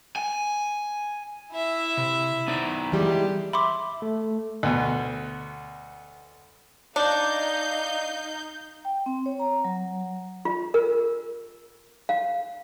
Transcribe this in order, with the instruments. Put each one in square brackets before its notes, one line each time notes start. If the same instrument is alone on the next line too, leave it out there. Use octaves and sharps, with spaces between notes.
[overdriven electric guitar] G#5
[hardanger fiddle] E4 E5
[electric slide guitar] C3
B3 D#4 D5
[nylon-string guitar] E3 G3 G#3 [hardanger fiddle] G4
[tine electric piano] E5 [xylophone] B5 C6 D6
[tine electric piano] A3
[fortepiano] D2 B2
[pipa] D4 [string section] D#4 F5 G6
[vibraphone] G5
C4
C#5
A#5
F#3
[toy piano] F4
A#4
F5